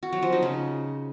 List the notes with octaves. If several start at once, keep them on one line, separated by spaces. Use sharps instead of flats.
F#4
F#3
F3
D#4
C#3